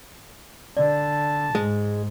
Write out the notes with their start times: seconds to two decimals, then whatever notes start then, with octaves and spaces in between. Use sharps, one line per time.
0.77 D3 D5 A5
1.55 G#2 G#3